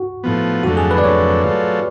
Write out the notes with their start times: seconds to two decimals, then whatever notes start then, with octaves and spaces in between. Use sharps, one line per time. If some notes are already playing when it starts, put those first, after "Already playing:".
Already playing: F#4
0.23 A2 F3 B3
0.63 F2 D3 F#3 A3 F#4
0.77 G#4
0.91 B4
0.98 D5
1.04 F2 D3 F#3 A3 C#5
1.43 F#3 A3 F4